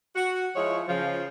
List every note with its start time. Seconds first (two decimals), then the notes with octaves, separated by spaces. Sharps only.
0.15 F#4
0.55 F3 G#3 E4 C#5
0.88 C#3 F3